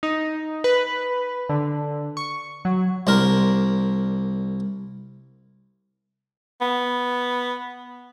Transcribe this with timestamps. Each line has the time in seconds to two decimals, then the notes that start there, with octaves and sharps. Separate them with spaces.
0.03 D#4
0.64 B4
1.49 D3
2.17 C#6
2.65 F#3
3.07 C2 D4 A#4
6.61 B3